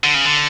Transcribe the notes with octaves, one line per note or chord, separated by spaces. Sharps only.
D3
C#3
D3